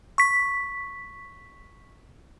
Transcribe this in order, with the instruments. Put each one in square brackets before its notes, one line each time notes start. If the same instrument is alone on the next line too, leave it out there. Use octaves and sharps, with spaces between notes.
[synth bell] C#6 B6